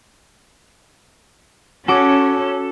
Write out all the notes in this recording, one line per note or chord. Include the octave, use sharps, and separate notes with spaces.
C#4 F#4 A4 D6